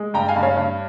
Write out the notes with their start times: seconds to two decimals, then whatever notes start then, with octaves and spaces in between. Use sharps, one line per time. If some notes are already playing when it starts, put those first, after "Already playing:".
Already playing: G#3
0.14 G2 G5 A#5
0.28 F5 G#5
0.36 G2
0.43 C#5 F5
0.57 G2